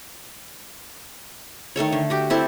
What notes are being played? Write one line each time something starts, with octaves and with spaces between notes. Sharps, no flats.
D#3 A3 A4 C#5
D3
F#4 G4
C4 E4 A4